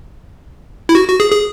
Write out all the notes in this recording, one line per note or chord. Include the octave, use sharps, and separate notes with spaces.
E4
F#4
F#4
G#4
G#4